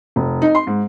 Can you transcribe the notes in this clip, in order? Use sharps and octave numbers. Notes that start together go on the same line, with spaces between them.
F1
D#4
C6
G#2